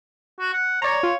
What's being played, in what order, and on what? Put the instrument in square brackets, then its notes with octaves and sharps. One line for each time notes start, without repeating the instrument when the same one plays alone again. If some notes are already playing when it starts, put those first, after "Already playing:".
[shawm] F#4
F#5
[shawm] C#5 [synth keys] D5 A#5
[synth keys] F4